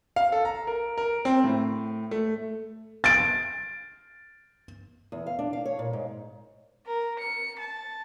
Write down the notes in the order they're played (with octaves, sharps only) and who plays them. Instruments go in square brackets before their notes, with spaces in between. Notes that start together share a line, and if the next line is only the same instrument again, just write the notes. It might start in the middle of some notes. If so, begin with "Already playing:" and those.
[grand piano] F5
A4
A#5
A#4
A#4
C4
A2
A3
[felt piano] A6 D7
[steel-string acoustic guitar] E2
F5
D4
F5
C#5
A#2
G#2
[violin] A#4
C#7
A5